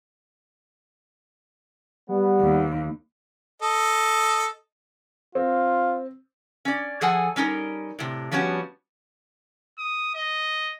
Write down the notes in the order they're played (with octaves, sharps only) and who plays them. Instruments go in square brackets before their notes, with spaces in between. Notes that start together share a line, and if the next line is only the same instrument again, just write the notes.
[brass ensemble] G3 B3
[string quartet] D#2
[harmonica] A4 D#5
[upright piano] C4 [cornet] F4
[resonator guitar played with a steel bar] C#4 D5
F3 G#4 A4 F#5 G#5
G3 C#4 D#4 A#4
A2 C3
F3 G3 B3 C#4 F#4
[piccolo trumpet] D#6
D#5